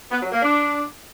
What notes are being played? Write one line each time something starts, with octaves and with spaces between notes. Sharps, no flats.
B3
F#3
A#3
D4